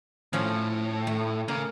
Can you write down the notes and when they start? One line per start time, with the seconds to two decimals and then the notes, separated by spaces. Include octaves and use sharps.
0.33 A2 F3 C#4
1.07 A3
1.48 C#3 A#3